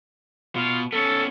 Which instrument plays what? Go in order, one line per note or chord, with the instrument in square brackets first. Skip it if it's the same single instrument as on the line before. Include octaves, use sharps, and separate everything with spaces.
[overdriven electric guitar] B2 [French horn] F4
[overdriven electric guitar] B3 C#4 [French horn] A4